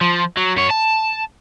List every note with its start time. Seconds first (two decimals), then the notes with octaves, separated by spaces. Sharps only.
0.01 F3
0.37 F#3
0.56 F#2 C#5
0.70 A5